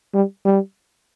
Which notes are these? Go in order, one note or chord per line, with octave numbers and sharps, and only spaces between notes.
G3
G3